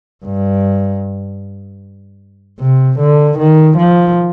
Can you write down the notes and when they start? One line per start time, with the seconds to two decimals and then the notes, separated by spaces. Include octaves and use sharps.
0.25 G2
2.60 C3
2.99 D3
3.39 D#3
3.77 F3